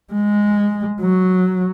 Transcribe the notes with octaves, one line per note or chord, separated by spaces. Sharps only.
G#3
F#3